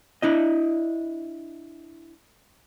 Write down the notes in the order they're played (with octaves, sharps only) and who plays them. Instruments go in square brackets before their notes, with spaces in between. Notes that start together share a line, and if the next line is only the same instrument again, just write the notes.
[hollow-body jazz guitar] D4 E4 D#5